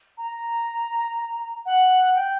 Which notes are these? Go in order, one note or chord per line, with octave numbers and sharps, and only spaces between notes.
A#5
F#5
G5